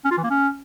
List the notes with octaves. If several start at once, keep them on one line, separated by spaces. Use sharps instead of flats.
C#4
F4
E3
A#3
C#4